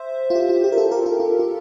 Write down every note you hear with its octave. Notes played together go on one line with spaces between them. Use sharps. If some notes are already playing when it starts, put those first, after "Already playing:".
Already playing: C5 E5
F4
G4
F4
G4
A#4
F4 A4
G4 A#4
F4 A4
F4
F4